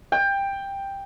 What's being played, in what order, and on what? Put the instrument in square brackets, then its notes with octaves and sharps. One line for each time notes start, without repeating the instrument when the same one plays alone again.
[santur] G5